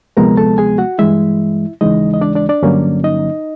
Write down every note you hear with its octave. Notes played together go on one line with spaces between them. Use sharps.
D2 C3 F3 G#3 B3 A#4 A#5
A4 A5
G#4 G#5
F#4 F#5
G2 E3 G#3 E4 E5
D#2 C#3 E3 G#3 D#4 D#5
D#5
D4 D5
D4 D5
D4 D5
G2 D3 F#3 A#3 C#4
D#4 D#5